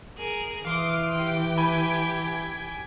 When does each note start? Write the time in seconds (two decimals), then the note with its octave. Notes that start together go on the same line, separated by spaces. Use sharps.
0.17 G#4 A#4
0.65 E3 F5 C6 D6 D#6
1.12 G4 G5
1.58 G#5 B5 G#6 B6